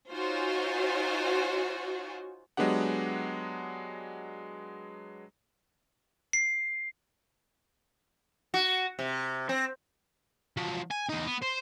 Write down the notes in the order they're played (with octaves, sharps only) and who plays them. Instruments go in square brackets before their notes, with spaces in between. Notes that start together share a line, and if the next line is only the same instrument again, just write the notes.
[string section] D#4 F4 F#4 C5 C#5 G#5
[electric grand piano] F#3 G#3 B3 D4 G4 F#5
[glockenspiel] C7
[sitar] F#4
C3
C4
[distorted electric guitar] F3 F#3
G#5
E2 D#4
B3
C5